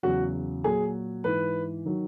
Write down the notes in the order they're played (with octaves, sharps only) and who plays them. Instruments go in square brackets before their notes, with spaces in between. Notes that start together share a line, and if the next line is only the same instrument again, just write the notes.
[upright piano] E2 C#3 F#3 F#4
A#2 F#3 G#4
G#2 E3 B4
D#3 F#3